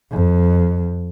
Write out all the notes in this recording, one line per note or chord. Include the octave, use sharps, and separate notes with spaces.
F2